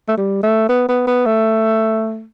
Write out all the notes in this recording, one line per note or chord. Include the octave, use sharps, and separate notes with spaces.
A3
G3
A3
B3
B3
B3
A3